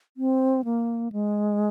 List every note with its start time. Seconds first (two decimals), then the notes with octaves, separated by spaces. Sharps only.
0.17 C4
0.65 A#3
1.12 G#3